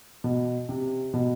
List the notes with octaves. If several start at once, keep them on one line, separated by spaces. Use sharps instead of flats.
B2
C3
B2